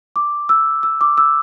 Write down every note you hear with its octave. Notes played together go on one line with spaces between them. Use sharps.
D6
E6
E6
D6
E6